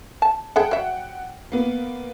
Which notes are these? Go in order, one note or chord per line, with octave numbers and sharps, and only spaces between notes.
A5
G#4 A4 E5 F#5 G5
F#3 E5
A#3 B3